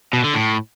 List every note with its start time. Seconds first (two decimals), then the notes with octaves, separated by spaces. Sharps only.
0.13 B2
0.24 D3
0.35 A2